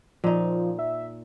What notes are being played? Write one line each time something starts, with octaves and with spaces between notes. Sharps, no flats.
A#2 F3 D#4
E5